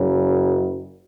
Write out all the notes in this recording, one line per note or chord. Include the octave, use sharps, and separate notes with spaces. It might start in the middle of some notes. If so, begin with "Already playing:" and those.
Already playing: F#1 F#2 C#3 F#3